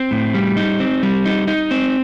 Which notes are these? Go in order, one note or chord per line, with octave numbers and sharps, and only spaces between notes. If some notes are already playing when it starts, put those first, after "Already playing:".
Already playing: C4
A2
G3
D#4
C4
G3
D#4
D#4
C4